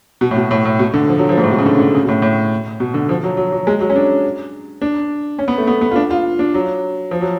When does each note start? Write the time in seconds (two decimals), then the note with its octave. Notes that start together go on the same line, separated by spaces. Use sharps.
0.21 B2
0.31 A2
0.37 B2
0.51 A2
0.65 A2
0.79 B2
0.94 D3
1.08 F3
1.18 F#3
1.29 F3
1.37 G#2
1.44 A2
1.51 B2
1.58 C#3
1.66 D3
1.79 D3
1.95 C#3
2.03 B2
2.08 A2
2.22 A2
2.80 B2
2.94 D3
3.09 F3
3.24 F#3
3.37 F#3
3.52 F#3
3.67 G#3
3.80 F#3
3.90 C#4
3.96 D4
4.82 D4
5.39 C#4
5.48 B3
5.58 A3
5.67 B3
5.81 B3
5.91 F4
5.96 D4
6.11 F4
6.39 D4
6.54 F#3
7.11 F3
7.21 F#3